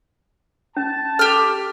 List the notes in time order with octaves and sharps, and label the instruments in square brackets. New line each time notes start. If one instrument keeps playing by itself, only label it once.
[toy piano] C#4 [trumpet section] A5
[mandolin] G4 F6 [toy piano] A4